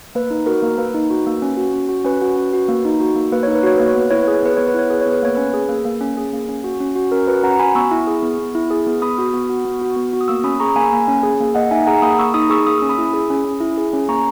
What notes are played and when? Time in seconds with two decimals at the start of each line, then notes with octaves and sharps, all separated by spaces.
0.15 A#3 B4
0.30 D#4
0.46 F#4 A#4
0.62 A#3
0.78 A#3 B4
0.94 D#4
1.10 F#4
1.27 A#3
1.42 C#4
1.57 F#4
1.73 C#4
1.89 F#4
2.05 C#4 B4
2.22 F#4
2.36 C#4
2.53 F#4
2.68 A#3
2.85 D#4
3.00 F#4
3.15 A#3
3.32 A#3 B4
3.43 D#4 C#5
3.55 B4
3.63 F#4 C#5
3.77 A#3 B4
3.89 C#5
3.95 B3
4.00 B4
4.11 E4 C#5
4.22 B4
4.27 G#4
4.34 C#5
4.43 B3 B4
4.57 B3 C#5
4.68 B4
4.74 E4 C#5
4.90 G#4 B4
5.01 B3 C#5
5.13 B4
5.22 A#3 C#5
5.35 C#4 B4
5.54 G#4
5.69 A#3
5.85 A#3
6.01 C#4
6.17 G#4
6.33 A#3
6.49 C#4
6.64 F#4
6.80 C#4
6.95 F#4
7.12 C#4 A#4
7.27 F#4 B4
7.43 C#4 F#5 A#5
7.59 F#4 G#5 B5
7.75 B3 C#6 E6
7.91 E4
8.07 G#4
8.22 B3
8.38 B3
8.55 E4
8.71 G#4
8.87 B3
9.02 B3 B5 D#6
9.18 F#4
9.33 B3
9.50 F#4
9.65 B3
9.81 F#4
9.96 B3
10.13 F#4
10.21 D#6
10.28 A#3 C#6 E6
10.44 C#4 B5 D#6
10.60 G#4 A#5 C#6
10.76 A#3 G#5 B5
10.92 A#3
11.08 C#4
11.23 G#4
11.40 A#3
11.55 A#3 D#5 F#5
11.71 D#4 E5 G#5
11.87 G#4 F#5 A#5
12.02 A#3 B5 D#6
12.19 A#3 C#6 E6
12.34 D#4 B5 D#6
12.50 G#4 C#6 E6
12.67 A#3 D#6
12.78 C#4 E6
12.89 B5 D#6
12.98 E4
13.13 G#4
13.30 C#4
13.45 C#4
13.60 E4
13.77 G#4
13.93 C#4
14.08 A#3 A#5 C#6